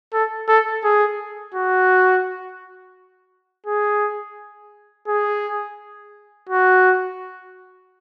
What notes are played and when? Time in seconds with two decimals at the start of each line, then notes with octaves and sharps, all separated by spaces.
0.13 A4
0.48 A4
0.84 G#4
1.54 F#4
3.66 G#4
5.07 G#4
6.49 F#4